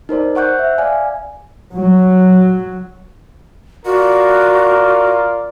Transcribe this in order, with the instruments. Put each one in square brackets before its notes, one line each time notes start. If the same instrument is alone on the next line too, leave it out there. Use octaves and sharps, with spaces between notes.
[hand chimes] D#4 A#4 C5 D5
C5 F#5 C#6 F#6 G6
E5
D5 F5 G#5
[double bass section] F#3
[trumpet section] F4 A#4 D5 [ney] F#4